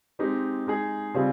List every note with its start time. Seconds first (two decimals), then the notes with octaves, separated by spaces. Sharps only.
0.19 G#3 C4 D#4 G4
0.67 G#3 D#4 G#4
1.14 C#3 G3 C4 F4 G#4